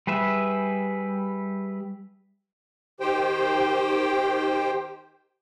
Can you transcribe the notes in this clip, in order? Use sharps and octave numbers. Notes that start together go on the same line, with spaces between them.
G3 G#4 B4 E5
D#3 G4 C5 G5